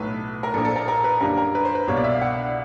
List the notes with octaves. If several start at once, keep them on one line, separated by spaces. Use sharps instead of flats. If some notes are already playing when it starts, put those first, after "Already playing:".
Already playing: B1 A2 F#3 A3 B4
A#4
A#1 A#2 F3 A4
A4
A#4
A#4
B4
F#2 D3 G3 A#3 A#4
A#4
B4
C5
B4
C2 B2 G3 A#3 C#5
D5
E5
F5
F#5